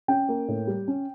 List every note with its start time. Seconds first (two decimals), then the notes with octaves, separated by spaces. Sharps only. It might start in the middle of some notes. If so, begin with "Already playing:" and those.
0.08 C#4 G5
0.29 A#3
0.48 A2
0.67 G3
0.88 C#4